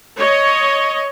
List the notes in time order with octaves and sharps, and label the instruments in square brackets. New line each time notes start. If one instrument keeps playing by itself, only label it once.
[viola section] C#5 D#5